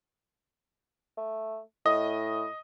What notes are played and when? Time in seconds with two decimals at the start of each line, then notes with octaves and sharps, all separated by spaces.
1.17 A3
1.86 A2 D#5 D#6